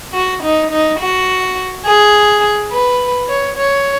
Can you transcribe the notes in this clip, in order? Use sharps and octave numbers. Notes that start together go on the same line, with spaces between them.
F#4
D#4
D#4
F#4
G#4
B4
C#5
C#5